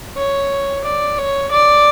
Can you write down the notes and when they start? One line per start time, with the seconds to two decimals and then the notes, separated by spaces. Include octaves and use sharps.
0.17 C#5
0.84 D5
1.18 C#5
1.52 D5